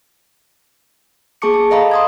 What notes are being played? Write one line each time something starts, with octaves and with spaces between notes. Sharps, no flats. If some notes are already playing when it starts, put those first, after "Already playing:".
A#3 G#4 A5 C#6 D6 C#7
A5
A4 D#5 F5 A#5 B5
C6 D#6 G#6